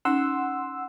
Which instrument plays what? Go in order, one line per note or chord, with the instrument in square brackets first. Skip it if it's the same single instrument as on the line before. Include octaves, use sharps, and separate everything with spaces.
[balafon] C#4 D#4 [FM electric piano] F#5 C6 E6